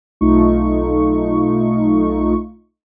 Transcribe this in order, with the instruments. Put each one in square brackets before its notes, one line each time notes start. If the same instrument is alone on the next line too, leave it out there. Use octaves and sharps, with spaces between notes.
[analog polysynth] B1 A3 D#4 F4 C#6